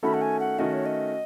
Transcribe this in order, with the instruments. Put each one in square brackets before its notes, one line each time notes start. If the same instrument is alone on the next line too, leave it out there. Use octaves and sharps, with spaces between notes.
[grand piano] D#3 A3 C#4 F#4 A4 [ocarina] B5
[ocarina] F#5
G#5
F#5
[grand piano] D#3 A3 C#4 F#4 A4 [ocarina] D#5
[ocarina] C#5
D#5